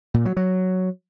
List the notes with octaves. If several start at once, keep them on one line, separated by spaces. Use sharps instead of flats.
A#2
F#3
F#3